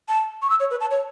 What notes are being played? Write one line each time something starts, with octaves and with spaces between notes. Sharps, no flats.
A5
C#6
E6
C#5
B4
A5
C#5